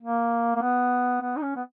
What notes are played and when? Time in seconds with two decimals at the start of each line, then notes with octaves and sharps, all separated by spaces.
0.02 A#3
0.56 A#3
0.62 B3
1.21 B3
1.37 D#4
1.42 C#4
1.56 B3